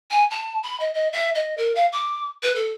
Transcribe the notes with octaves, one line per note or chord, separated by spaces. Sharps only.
G#5
A5
B5
D#5
D#5
E5
D#5
A#4
F5
D6
B4
A4